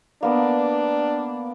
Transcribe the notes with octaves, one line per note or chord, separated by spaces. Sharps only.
A#3 B3 D4